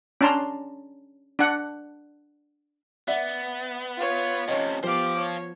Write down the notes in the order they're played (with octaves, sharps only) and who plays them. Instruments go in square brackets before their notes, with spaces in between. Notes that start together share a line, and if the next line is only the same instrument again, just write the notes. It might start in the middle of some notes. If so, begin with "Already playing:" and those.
[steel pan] C#4 D4 A5 A#5 C6
D4 F#5
[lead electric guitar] B3 [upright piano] D5 E5 F#5
[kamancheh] F4 C#5
[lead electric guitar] F2 C3 [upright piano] C#4 D#5
[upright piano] F3 B3 [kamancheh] G4 D6 [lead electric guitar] C5 F5
[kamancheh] C#5